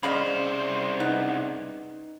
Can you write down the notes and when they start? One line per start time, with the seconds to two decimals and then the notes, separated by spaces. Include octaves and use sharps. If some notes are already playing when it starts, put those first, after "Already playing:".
0.03 C2 C#4 G#4 C5 D5 D#5 F5 B5
1.00 B3 D#4